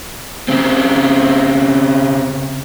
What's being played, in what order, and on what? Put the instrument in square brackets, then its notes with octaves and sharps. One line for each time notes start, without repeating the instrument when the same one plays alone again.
[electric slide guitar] C#3 C4